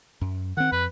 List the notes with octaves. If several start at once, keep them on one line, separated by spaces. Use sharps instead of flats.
F#2
D#3 C4 F#5
F2 B4